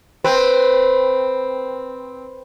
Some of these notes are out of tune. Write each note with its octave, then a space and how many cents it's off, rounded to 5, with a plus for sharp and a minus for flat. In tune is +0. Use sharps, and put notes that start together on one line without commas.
C4 +0 B4 +0